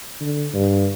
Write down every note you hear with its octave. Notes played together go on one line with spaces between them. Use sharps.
D3
G2